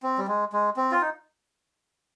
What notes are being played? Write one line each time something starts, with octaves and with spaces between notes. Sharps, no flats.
C4
G3
G#3
G#3
C4
F4
D#4